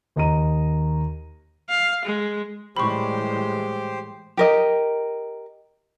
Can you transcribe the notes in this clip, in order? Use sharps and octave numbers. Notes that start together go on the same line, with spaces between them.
D#2 D#5 A#5 D#7
F5
G#3
A2 E3 G3 G#3 G4 C5 B5 C#6
G4 A#4 D#5